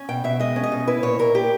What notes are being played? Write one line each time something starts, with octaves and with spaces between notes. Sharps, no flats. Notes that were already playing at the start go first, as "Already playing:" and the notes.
Already playing: C#4
B2 G5
B2 E5
G#3 D#5
C#4
D#5
B2
E4 B4
A#2 C#5
A#2 A#4
A#3 G4